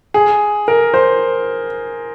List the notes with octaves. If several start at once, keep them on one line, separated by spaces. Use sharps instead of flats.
G#4
A#4
C5